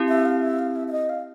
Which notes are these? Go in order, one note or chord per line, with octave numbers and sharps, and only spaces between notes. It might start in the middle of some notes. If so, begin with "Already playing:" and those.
Already playing: C4 E4 G4
E5
F5
E5
F5
E5
E5
D#5
F5